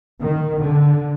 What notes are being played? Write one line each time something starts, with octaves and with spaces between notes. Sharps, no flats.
D#3
D3